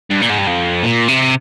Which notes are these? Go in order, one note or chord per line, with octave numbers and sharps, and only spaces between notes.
G2
A#2
G#2
G2
F2
A#2
C3